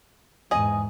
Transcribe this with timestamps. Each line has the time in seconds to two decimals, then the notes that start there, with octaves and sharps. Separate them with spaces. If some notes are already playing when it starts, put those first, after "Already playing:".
0.51 E2 G#2 G#4 D#5